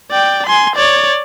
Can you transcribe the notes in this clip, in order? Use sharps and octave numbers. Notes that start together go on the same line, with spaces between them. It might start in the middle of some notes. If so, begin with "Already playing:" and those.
D5 G5
G#5 C6
C#5 D5